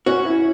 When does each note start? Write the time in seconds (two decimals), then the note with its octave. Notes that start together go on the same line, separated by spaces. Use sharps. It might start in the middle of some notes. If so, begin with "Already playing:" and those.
0.06 C#4 F#4
0.25 E4